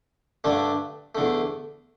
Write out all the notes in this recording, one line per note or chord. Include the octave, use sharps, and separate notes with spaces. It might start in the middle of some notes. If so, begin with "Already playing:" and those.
G2 D3 A3 D4
E2 D3 A3